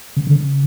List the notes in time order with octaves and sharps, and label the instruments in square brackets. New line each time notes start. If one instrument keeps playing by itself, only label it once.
[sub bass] C#3
D3
C#3